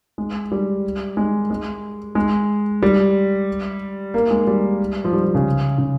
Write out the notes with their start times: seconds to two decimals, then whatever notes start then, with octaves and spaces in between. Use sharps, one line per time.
0.18 G#3
0.52 G3
1.17 G#3
1.50 G#3
2.15 G#3
2.82 G3
4.14 A#3
4.30 G#3
4.47 G3
5.04 F3
5.13 G3
5.24 F3
5.35 C#3
5.78 C#3